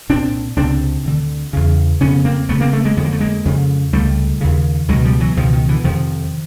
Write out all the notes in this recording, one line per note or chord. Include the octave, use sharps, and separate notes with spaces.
C2 A#2 C4 D4
C#2 C3 C4 D4
D2 D3
E2 C#3
F2 C#3 B3 C#4
A#3 C4
D2 C#3 A3 B3
A#3 C4
A3 B3
G#3 A#3
F2 D3 B3
A#3
A3
G#3 A#3
F2 C#3
C#2 C3 G3 A3
D#2 C#3
C#2 B2 F#3 G#3
F3 G3
E3 F#3
C#2 B2 D#3 F3
D#3
D3 E3
F2 C3 D#3 F3